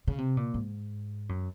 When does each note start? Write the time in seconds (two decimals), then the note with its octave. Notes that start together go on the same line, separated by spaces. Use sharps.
0.07 C#3
0.18 C3
0.37 A#2
0.54 G#2
1.29 F#2